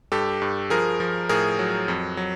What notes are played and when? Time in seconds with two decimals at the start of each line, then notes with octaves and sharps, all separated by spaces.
0.12 G2 G4 A4
0.42 G2
0.70 F3 G#4 A#4
1.00 F3
1.29 A2 G#4 A#4
1.59 F#3
1.88 F2
2.17 F#3